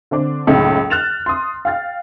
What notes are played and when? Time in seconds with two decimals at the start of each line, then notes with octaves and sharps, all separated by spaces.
0.11 D3 C4 D4
0.47 F#1 C#2 A2 D#4 A4
0.90 F6 F#6 A6 E7 F7
1.26 C6 D#6
1.65 F5 G5 F6 A6